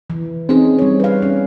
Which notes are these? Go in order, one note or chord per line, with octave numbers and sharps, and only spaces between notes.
E3
C4 C#4 D#4 G#4
G3 C#5
B4 F5
C#4